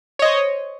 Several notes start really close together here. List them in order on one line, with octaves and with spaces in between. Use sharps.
C#5 D#5 C5